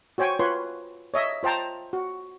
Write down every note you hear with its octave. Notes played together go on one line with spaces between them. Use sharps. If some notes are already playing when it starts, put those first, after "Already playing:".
F#4 C5 C#5 G5 G#5
F4 B4 C#5 C6
C#5 D#5 E5
F4 C5 G5 A5 A#5
F#4